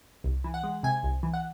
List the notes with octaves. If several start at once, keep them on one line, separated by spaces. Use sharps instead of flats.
C2
E3
F#5
G#3
C3 G#5
C2
E3
F#5